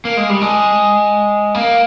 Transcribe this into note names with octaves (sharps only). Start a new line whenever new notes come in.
A#3
G#3
G3
G#3
A#3